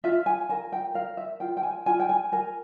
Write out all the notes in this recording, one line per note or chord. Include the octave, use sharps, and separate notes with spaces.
F4 E5
G#5
A#4 G#5
G5
A#4 F5
E5
F4 G5
G5
G#5
F4 G#5
G5
G#5
A#4 G#5